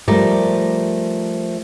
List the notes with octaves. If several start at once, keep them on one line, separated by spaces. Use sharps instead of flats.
F3 G3 A3 A#4 D5